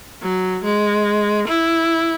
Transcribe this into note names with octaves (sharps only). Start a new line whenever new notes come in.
F#3
G#3
E4